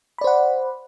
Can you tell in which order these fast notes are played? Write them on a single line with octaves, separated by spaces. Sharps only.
B5 D5 C5 F#5